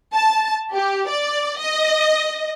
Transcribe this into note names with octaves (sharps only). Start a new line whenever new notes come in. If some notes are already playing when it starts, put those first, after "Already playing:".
A5
G4
D5
D#5